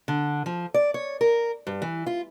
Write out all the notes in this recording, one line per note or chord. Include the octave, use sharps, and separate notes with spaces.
D3
F3
D5
C#5
A#4
G2
E3
F4